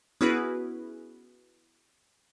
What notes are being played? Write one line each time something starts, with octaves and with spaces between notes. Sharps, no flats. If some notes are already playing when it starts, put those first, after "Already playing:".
B3 C#4 E4 F#4 G#4 B4